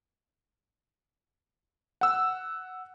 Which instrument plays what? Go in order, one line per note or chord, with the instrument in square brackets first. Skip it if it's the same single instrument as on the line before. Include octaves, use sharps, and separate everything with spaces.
[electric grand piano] F#5 E6